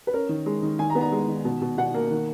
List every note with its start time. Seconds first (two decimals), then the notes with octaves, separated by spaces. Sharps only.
0.07 B4
0.13 C#4 A#4
0.29 D#3
0.46 G#3
0.63 D#3
0.79 D#3 G#5
0.90 A#5
0.95 B3
1.01 A#5
1.12 G#3
1.28 D#3
1.45 B2
1.61 B2
1.77 B2 F#5
1.94 A#3
2.11 D#3